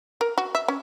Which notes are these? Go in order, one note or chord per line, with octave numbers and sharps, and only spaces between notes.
A#4
F#4
E5
C#4